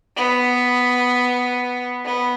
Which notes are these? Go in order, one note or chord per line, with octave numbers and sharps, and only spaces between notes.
B3
B3